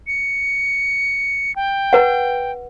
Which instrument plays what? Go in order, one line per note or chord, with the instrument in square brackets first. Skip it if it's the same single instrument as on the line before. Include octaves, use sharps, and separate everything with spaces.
[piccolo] C#7
G5
[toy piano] B4 F#5